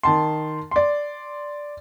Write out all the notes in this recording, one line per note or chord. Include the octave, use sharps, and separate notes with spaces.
D#3 A5 C6
D5 C6